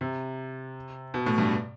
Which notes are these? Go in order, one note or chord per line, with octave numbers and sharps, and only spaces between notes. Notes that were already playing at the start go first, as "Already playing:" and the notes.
C3
B2
A2
G2